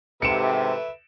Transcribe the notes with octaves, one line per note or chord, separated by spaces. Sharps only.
G#2 C3 A4 B4 E5 C#7 D7 E7